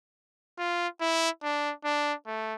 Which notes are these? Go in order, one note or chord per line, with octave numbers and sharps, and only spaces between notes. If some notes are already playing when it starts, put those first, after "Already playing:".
F4
E4
D4
D4
A3